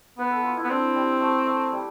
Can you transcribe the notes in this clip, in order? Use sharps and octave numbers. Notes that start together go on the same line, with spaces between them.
B3 B4
A4
F4
E4
B3
C4 D4
G3
A3
A3
G3